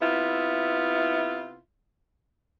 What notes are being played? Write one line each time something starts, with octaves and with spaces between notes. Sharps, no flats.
C3 B3 E4 F4